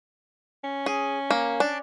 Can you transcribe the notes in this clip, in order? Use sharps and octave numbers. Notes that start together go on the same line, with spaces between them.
C#4
G#4
A#3
D4